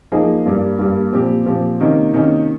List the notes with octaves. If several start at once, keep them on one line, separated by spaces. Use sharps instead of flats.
F3 A#3 D#4 G#4
G2 G3 A#3
G2 G3 A#3
A#2 F3 C4 G4
A#2 F3 C4 G4
C3 D#3 A#3 C#4
C3 D#3 A#3 C#4